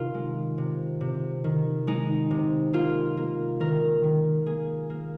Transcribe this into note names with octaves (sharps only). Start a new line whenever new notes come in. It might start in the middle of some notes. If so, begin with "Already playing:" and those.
Already playing: C3 D#3 F4 A#4
G#3
C3
C3
D#3
G#3 D#4
C3
A#3 F4
A#3
D#3 A#4
D#3
A#3 G#4
A#3